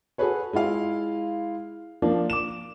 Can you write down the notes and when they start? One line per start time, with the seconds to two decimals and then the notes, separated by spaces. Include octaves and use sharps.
0.18 F#4 G#4 A4 B4 C#5
0.53 G#3 E4 F4 F5
2.02 F3 A#3 D4
2.30 D6 E7